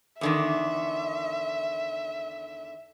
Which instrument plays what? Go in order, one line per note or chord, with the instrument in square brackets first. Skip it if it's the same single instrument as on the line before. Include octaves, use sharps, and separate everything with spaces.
[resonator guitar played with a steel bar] E2 D3 D#3 [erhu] E5